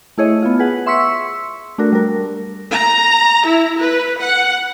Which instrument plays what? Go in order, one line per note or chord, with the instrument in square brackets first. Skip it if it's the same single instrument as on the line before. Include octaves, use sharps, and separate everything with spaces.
[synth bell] A3 E4 G#4 C#5 D#5
B3 F4
G#4 B4 F#5
E5 C6 C#6 E6 B6 C#7
A3 D4 F#4 A#4
G3 A#4
[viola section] A#5
E4
B4
F#5